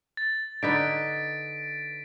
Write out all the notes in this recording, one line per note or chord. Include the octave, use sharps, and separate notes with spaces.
A6
D3 D#4 B4 A6 B6 D7